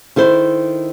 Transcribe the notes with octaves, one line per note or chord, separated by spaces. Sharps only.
D#3 E4 A4 C5